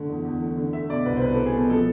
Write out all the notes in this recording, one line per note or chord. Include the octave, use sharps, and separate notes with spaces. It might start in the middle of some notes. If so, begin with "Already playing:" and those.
Already playing: D3 A3
E2
E2
A3
D3
A3 E5
B2 D5
C2 B4
C5
C2 B4
A3 A4
G#4
B2 A4
F3 A4